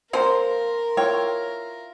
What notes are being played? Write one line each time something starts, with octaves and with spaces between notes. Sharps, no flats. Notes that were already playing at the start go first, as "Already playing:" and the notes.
F3 A#3 A#4 C5 G5 A#5 C6
E4 F4 C#5 F5 G5